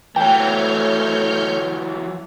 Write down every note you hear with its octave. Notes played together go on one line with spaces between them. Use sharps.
E3 F#3 A3 C#5 G5 F6 G6